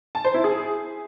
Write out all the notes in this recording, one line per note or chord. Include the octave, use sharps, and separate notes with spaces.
A5
C5
E4
G#4